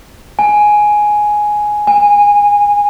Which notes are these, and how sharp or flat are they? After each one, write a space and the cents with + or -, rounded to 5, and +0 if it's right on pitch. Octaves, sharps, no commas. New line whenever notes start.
G#5 +5
G#5 -20